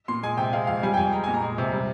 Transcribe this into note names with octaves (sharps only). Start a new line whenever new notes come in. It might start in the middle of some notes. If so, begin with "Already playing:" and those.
A#2 C6
G#3 G#5
C3 G5
G#3 F5
F2 F5
G3 G#5
G5
F2 G#5
G#3 A#5
A#2 G#5
A#5
G#3
C3
G3